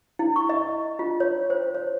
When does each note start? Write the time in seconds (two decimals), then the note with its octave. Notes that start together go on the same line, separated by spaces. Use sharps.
0.19 E4
0.36 C#6
0.49 D#5
0.99 F4
1.20 C#5
1.50 C5
1.75 C#5